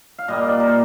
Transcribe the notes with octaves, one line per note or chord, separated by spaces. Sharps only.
F5
A#2 G3 A#3 D#5
D5
A#4
C5